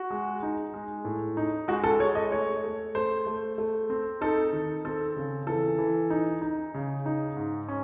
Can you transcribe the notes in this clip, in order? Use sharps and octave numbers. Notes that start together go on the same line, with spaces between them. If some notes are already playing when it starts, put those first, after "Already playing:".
Already playing: F#4
G#3
D#4
G#3
A2
D#4
G#3 F#4
A4
G#3 C#5
D#5
A3 C#5
A3
A3 C5
A3
A3
C4
D#4 A4
D#3
C4 A4
C#3
E3 A4
E3
D#4
D#4
C#3
D#4
G#2
C#4